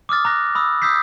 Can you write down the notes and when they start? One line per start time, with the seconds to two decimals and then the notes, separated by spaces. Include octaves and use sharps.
0.09 D6 D#6 F6 A6
0.25 A#5 F#6 A#6
0.55 B5 D#6 E6
0.82 D#6 E6 G6 B6 C7